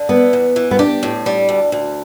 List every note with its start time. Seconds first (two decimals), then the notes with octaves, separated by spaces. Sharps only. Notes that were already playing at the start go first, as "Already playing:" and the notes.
Already playing: D3
0.09 B3 E4
0.33 E2
0.56 E3
0.71 B3
0.79 D4 G4
1.03 A2
1.26 G3
1.49 D2
1.72 D2